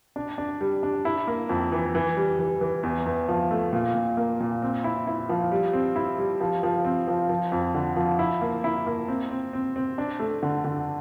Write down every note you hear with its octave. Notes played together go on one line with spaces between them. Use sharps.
D4
D4
G3
D4
E4
A#3
F2
E3
E3
G3
E3
E3
E2
E2
F3
A3
A#2
A#2
A#3
A#2
C4
E4
E4
F3
G3
C4
E4
G3
F3
F3
C4
F3
F3
F2
D3
F3
E4
A#3
E4
A#3
C4
C4
C4
C4
D4
A3
D3
D3